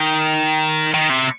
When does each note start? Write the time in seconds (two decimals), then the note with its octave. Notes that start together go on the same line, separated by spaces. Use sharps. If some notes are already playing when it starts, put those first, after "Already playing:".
Already playing: D#3
0.94 D#3
1.10 C3